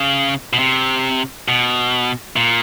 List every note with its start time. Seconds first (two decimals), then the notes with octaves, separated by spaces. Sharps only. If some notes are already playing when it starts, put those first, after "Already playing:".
Already playing: C#3
0.53 B2
0.59 C3
1.48 B2
2.36 A#2